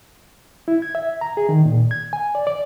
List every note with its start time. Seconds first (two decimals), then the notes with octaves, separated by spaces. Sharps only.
0.68 E4
0.82 G#6
0.95 E5
1.21 A#5
1.37 G#4
1.49 D#3
1.65 A#2
1.91 G#6
2.13 G#5
2.35 D5
2.47 D5